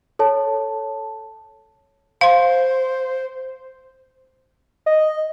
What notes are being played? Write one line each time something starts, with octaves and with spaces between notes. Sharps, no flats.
A4 C#5 A5
C5 F5 C6
D#5